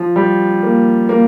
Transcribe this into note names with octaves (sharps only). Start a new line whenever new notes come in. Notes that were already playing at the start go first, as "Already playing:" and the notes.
Already playing: F3
G3
A#3
A#3